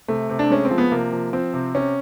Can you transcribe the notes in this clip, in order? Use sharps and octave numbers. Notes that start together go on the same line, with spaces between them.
C3 A3
C3
D4
G#3 C#4
C4
F3
B3
C3 A#3
F3
F3 C4
C3
C3 C#4